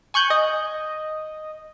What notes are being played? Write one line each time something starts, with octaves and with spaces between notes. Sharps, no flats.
G#5 C#6 F#6 G6
D#5